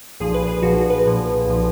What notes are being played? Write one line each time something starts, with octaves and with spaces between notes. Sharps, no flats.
B1 A#2 F3 G#4
B4
G#4
B1 A#2 F3 F#4
B4
B1 A#2 F3
B1 A#2 F3